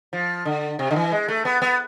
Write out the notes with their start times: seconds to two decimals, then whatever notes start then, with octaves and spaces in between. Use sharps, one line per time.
0.13 F3
0.45 D3
0.79 C3
0.91 D3
0.96 E3
1.12 G#3
1.28 A3
1.45 B3
1.62 B3